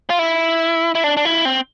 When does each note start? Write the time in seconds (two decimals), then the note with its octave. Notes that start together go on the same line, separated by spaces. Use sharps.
0.10 F4
0.19 E4
0.95 E4
1.04 D4
1.17 D4
1.25 E4
1.45 C4